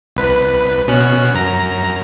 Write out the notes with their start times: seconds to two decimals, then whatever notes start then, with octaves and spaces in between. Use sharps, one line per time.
0.17 C2 B4
0.88 B2 C#4 F#6
1.35 F#2 A#5